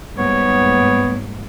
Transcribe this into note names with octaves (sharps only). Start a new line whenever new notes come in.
G#2 G3 A#3 B3 C#5